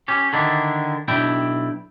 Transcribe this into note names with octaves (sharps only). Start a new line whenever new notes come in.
C#4 G4
D3 D#3 D4 E4
B1 D4 E4 G5